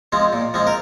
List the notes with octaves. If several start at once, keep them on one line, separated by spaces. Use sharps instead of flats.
F3 G#3 C4
A#2
F3 G#3 C4
A#4